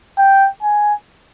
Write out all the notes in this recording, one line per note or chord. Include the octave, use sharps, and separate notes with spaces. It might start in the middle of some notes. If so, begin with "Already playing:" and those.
G5
G#5